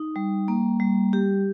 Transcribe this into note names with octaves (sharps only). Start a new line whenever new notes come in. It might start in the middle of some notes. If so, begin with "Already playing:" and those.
Already playing: D#4
G3
A#3
G3
G4